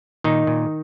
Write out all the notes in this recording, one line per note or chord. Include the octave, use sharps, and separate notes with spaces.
A#2 D#3 D#4
A#2